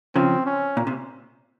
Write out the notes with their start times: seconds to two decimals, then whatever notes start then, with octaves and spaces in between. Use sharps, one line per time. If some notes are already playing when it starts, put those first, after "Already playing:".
0.15 C#3 F3 C4
0.46 C#4
0.77 A#2
0.87 C3